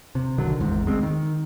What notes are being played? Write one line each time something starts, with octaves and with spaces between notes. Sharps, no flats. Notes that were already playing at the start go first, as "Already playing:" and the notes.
C3
B1 D3 D#3 F#3
G#1 E2 G#2
D2 G#3 C4
D#3